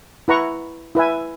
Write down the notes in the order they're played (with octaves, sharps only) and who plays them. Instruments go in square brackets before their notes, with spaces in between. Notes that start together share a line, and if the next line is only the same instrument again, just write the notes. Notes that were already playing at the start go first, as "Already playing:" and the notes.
[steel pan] E4 B4 F#5 A#5 C#6
E4 B4 E5 G#5